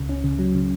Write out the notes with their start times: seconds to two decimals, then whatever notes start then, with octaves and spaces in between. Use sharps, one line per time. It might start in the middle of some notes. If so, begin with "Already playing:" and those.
Already playing: C#2 C#3
0.09 C#4
0.24 C#3
0.39 F#3
0.55 C#3